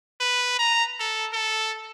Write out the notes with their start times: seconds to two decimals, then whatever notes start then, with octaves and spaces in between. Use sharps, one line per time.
0.20 B4
0.59 A#5
1.00 A4
1.33 A4